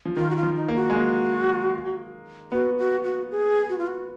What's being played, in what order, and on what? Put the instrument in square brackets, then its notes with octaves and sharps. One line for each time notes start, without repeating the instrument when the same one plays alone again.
[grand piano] F3
[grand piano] D#3 [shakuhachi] F4
[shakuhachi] F#4
F4
[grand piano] F3
[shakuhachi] D#4
[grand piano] A#3
[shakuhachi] F#4
[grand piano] G#3
A#3
[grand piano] B3 [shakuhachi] F#4
[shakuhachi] F#4
F#4
G#4
F#4
F4
F#4